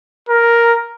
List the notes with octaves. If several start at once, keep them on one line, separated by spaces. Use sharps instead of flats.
A#4